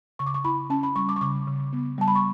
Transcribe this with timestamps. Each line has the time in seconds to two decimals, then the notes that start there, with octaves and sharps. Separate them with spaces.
0.19 C#3 C#6
0.26 D6
0.34 C#6
0.44 E4 B5
0.70 C#4 A5
0.83 B5
0.96 G3 C#6
1.09 D6
1.16 C#6
1.21 C#3 D6
1.47 C#3
1.73 B3
1.98 G3 A5
2.08 B5
2.15 C#6